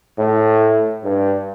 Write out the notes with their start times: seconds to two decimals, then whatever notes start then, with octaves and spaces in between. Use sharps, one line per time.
0.18 A2
1.04 G2